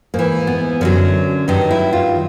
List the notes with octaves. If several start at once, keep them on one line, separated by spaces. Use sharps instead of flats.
G#2 E3 A#3
B3
F#2 D3 F#3 C#4
G2 D#3 F#3 D#4
E4
F4